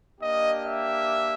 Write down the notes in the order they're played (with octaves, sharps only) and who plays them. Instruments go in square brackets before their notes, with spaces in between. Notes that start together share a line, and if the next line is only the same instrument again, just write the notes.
[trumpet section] A#3 D4 G4 D#5
E5